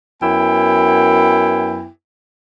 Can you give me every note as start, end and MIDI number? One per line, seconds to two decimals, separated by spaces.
0.21 1.87 42
0.21 1.87 59
0.21 1.87 64
0.21 1.87 79
0.21 1.87 80